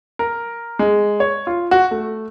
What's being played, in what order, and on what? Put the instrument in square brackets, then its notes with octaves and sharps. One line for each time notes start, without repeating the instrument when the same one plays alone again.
[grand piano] A#4
G#3
C#5
F4
F#4
A3